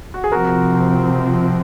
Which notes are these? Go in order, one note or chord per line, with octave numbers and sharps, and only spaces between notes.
F#4
G#4
C3 F3 C4 F#4 A#4